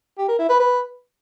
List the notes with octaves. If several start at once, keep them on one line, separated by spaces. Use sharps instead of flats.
G4
A#4
E4
B4
B4